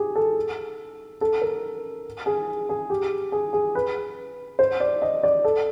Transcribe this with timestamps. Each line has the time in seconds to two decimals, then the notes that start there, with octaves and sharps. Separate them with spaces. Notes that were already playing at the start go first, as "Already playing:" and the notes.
Already playing: G4 G#4
0.15 A4
1.21 A4
1.41 A#4
2.26 G#4
2.69 G#4
2.90 G4
3.32 G#4
3.53 G#4
3.75 B4
4.59 C5
4.80 D5
5.02 D#5
5.23 D5
5.44 A4